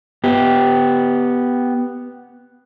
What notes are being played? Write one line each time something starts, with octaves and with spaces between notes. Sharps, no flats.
B3 G4